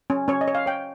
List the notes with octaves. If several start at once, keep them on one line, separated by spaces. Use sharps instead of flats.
C#4
C#4 C#5
D#5
C#5
F5
C#5 G5